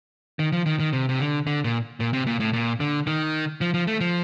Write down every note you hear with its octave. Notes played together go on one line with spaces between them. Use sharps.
D#3
F3
D#3
D#3
C3
C3
D3
D3
A#2
A#2
C3
A#2
A2
A#2
D3
D#3
F3
F3
A3
F3